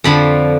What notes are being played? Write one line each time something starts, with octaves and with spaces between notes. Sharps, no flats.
F2 D3 F3 B5